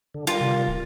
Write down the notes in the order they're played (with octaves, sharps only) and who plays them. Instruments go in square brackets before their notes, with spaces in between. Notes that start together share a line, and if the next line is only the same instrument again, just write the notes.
[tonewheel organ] D3
[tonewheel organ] G3 A#4 [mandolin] F4
[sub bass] C3
D1